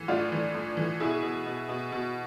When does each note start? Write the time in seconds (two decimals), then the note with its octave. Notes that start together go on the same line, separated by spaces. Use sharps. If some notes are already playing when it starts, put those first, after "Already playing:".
Already playing: E3
0.08 A2 D4 F4
0.32 E3
0.54 A2
0.77 E3
1.00 B2 E4 G#4
1.23 B2
1.46 B2
1.69 B2
1.92 B2